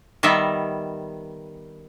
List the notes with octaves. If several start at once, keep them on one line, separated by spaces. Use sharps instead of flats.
D#3 G3 B3 E5